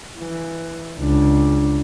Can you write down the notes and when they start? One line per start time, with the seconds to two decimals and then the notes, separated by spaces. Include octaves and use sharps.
0.19 E3
0.99 C#2 D4